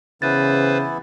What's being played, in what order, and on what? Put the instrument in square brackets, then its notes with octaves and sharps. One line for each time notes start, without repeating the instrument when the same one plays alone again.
[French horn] C#3 [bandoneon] E3 B3 E4 [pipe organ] B4 C5 [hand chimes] A6